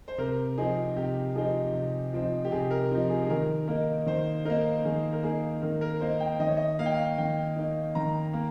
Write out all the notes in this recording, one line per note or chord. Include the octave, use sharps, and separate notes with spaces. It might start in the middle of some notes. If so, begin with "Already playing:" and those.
C5
C3 A#4
F3 C4 D#4 G#4
C3 G4
F3 C4 D#4 G#4
C3
F3 C4 D#4
G4
C3 G#4
A#4
F3 C4 D#4
G#4
G#4
D#3 A#4
A#3 D#4 A#4
D#3 C5
A#3 D#4 A#4
D#3 G#4
A#4
A#3 D#4 G#4
D#3 A#4
A#4
A#3 D#4 C5
G5
D#3 D#5
C#5
D#5
A#3 D#4 F5
G5
F5
D#3 G5
A#3 D#4
D#3 A#5
A#3